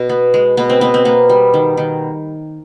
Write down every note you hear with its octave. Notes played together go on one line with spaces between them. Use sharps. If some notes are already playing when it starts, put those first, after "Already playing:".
Already playing: B2
B3
G#3
B2 B3
C4
B2 B3
C4
A#3 B3
G3
D#3
D#3